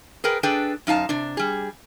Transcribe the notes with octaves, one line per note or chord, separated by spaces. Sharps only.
G#4 A#4 B4 G5
D4 G#4 A4 B4 G5
F#2 D#4 F5 A5
C3 D4
G3 G#4